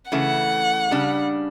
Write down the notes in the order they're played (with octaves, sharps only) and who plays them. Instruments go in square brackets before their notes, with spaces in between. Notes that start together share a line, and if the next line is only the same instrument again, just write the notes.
[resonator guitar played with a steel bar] C#3 E3 A3 [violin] F#5
[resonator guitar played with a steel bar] C#3 G3 D4